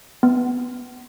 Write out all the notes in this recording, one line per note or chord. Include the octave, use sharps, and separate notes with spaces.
B3